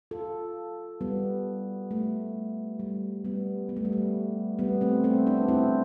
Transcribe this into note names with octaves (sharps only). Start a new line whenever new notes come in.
F4 A4
G3 B3
A3
G3
G3 B3
B3
A3
G3
A3
G3 B3
A3 C4
A3 C4
B3 D4
C4 E4